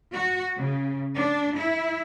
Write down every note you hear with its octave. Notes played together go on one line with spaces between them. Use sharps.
F#4
C#3
D4
E4